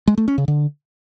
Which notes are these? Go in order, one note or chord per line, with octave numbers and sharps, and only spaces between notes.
G#3
A3
C#4
C#3
D3